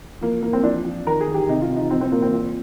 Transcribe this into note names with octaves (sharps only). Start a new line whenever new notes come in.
F3 A#3
F3 A#3
C4
F3 D4
F3
D#3 A#4
G#4
D#3
G4
C3 D#4
F4
C3
D#4
F3 C4
C4
A#2 A#3
C4
A#2